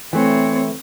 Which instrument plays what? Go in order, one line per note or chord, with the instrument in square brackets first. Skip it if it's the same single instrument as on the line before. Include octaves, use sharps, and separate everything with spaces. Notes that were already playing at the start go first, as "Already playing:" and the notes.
[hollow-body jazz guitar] E3 A3 [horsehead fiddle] C4 C#5